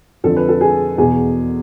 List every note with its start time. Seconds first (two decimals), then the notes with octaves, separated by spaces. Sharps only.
0.24 F2 D3 F3 A4
0.36 B4
0.49 A4
0.61 G#4
0.98 E2 B2 G#4